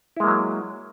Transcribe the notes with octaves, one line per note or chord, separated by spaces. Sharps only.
F#3 G#3 A#3 E4